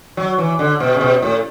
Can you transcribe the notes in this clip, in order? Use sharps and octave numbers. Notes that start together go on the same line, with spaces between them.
F#3
E3
D3
B2
C#3
B2
A2